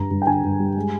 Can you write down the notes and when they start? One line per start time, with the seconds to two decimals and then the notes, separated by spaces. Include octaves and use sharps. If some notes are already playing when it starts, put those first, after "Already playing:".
Already playing: G2 G3 A#5
0.11 G2
0.22 G5
0.27 D3 G#5
0.43 G2
0.59 G3
0.77 G#3